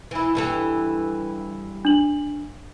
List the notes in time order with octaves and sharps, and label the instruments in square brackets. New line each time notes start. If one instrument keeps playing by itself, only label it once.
[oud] E3 E4
G2 E3 A4
[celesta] D4 F#7